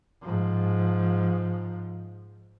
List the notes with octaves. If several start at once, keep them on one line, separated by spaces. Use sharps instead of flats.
G#2 F3